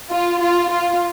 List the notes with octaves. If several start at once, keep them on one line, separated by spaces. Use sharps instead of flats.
F4
F4
F4